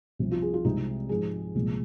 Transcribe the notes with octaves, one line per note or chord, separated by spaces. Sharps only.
C2 C3 F3
F4
G#4
F4
C2 C3 G#3 D#4
G#2 F3 G#3 G#4
C2 A#2 F3 G#3